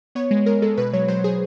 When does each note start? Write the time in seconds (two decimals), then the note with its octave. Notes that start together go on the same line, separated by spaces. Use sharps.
0.15 B3 C#5
0.31 G#3
0.46 G#3 A#4
0.62 G#3 A4
0.77 B2 B4
0.93 F#3 C#5
1.08 F#3 C5
1.24 F#3 G#4